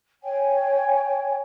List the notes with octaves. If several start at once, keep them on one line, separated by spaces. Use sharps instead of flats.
C#5 G5 G#5